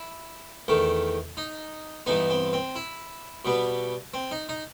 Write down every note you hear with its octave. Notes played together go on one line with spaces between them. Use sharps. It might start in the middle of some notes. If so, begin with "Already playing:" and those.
Already playing: E4
E2 D#3 A3
D#4
G2 E3 B3 D#4
C4
C4
E4
B2 G3 B3
C4
D#4
D#4